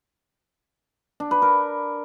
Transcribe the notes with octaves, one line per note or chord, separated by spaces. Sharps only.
D4
B4
A#4